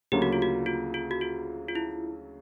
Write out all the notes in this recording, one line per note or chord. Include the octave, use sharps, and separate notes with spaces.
D2 C#3 F#3 A#3 G4
F#4
F4
F#4
F4
F4
F#4
F4
F4
E4